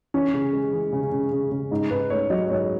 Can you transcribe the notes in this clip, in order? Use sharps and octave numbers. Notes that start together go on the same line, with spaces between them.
E3 C#4
C#3
G#3
E3
C#3
C#3
C#3
C#3
G#2 D#4
G#2 B4
A3 C#5
F#3 D#5
G#2 C#5